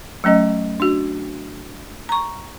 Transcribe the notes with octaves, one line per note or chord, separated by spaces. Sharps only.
F#3 A3 C#4 D#5
D4 F#4
A#5 C#6